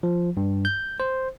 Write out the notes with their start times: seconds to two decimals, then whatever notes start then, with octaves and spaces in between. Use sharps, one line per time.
0.03 F3
0.37 G2
0.65 G6
1.00 C5